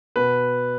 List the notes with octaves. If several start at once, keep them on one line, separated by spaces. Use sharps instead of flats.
B2 B4